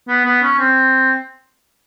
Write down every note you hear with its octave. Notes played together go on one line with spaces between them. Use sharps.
B3
B3
C#4
C4